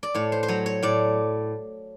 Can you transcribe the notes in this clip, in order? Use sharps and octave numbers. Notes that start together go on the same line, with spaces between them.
D5
A2 C#5
C5
C5
F#3 C#5
C#5
A2 D5